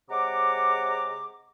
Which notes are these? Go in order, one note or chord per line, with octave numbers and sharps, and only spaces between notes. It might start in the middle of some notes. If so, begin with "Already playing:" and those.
C3 G#3 C#5 F#5 A#5 D6